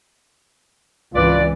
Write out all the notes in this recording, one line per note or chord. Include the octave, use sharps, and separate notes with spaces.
G#1 C#2 E3 F4 B4 D5